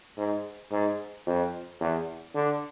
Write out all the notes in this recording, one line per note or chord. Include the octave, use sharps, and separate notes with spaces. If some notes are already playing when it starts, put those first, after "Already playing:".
G#2
G#2
F2
E2
D3